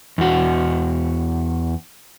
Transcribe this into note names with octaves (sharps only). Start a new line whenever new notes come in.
E2 F#4